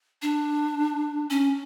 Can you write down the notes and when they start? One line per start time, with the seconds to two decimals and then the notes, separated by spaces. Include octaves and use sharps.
0.22 D4
1.30 C#4